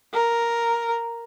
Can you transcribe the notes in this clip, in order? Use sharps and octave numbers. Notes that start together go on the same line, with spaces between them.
A#4